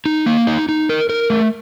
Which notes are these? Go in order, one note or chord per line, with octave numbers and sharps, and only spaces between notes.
D#4
A#3
D#4
D#4
A#4
A#4
A3